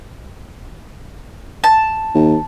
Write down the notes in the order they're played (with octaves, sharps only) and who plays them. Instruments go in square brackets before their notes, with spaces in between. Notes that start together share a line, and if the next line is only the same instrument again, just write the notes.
[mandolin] A5
[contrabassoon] D#2